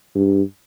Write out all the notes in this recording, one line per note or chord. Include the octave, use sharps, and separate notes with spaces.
G2